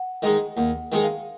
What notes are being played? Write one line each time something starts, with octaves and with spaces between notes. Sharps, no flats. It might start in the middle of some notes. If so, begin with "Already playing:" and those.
Already playing: F#5
D#3 G#3 D#4 G#4 D#5
D#2 F#5
D#3 G#3 D#4 G#4
F5